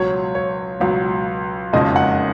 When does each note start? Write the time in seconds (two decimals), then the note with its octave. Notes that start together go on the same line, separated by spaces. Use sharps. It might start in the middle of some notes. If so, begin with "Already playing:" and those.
Already playing: C#2 B2 F#3 C#5
0.35 C#5
0.80 C#2 B2 F#3
1.73 F#1 F2 C#3 G#3 D#4 D#5
1.96 F#5